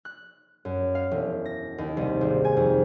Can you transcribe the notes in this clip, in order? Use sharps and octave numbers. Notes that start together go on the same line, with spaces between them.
F#6
F#2
F5
E1
A#6
D#2
C2
G#1
G#5
F2